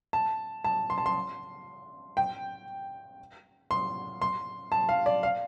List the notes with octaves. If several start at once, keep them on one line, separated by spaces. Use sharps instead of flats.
A5
A5
C6
A5
C6
G5
C6
C6
A5
F5
D5
F5